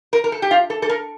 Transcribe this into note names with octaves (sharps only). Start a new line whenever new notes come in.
A#4
A#4
A4
G4
F4
A4
A4
A#4